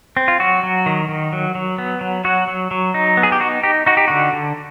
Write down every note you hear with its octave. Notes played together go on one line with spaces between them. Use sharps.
C4
F4
F#3 F#4
F#3
D#3
D#3
F#3
F#3
B3
F#3
F#3 F#4
F#3
F#3
D#4
B3
G#4
G4
D#4 F#4
D#4 G4
D#4 F#4
G4
D3 F#4
D3